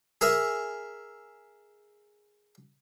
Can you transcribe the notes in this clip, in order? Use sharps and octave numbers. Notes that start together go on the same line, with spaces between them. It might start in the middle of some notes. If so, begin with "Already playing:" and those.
G#4 A#4 E5